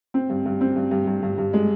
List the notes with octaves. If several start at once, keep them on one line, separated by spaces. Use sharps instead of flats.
C4
G2
G2
C4
G2
G2
G2
G2
G2
G#3